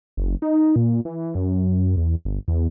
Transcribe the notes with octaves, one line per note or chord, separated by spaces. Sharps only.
F#1
D#4
A#2
E3
F#2
E2
G1
E2